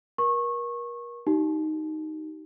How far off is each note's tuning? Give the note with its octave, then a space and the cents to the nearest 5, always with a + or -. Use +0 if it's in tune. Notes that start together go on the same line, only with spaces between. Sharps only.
A#4 +35 C#6 -25
D#4 +0 G4 -35